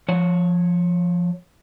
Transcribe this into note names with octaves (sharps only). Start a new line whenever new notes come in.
F3 C#5